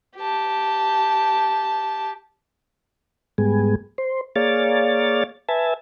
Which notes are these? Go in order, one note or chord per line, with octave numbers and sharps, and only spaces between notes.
G4 A5
G#2 G3 G#3 B3 G#4
C5
A#3 G#4 C#5 D5 F5 A6
B4 E5 G#5 A5